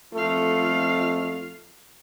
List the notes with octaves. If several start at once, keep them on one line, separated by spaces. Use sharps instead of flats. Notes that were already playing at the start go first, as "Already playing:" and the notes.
F2 A3 F4 F5